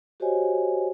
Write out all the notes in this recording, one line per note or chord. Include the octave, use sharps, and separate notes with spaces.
F#4 G4 C5 C#5 D#5 G#5